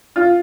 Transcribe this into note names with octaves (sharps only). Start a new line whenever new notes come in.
F4